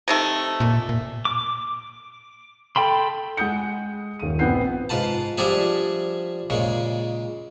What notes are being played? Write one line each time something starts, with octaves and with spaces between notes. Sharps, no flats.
C3 D#3 A3
A#2
A#2
D6
A4 G5 B5 C6
G#3 F#5 D#6 G6 C#7
D#1 D#7
A#1 B3 C4 F#5 G6 C7
G#2 F4 B4 A5
F3 G3 D4 G#4 E5
A#2 C#3 G#3